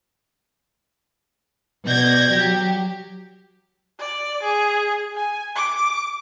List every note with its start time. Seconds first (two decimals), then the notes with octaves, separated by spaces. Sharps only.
1.85 B2 D5 G6 G#6 A#6
2.31 F#3 G4
3.99 D5
4.43 G#4
5.15 G#5
5.56 D6